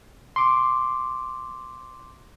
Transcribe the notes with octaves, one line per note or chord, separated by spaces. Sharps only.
C6 D6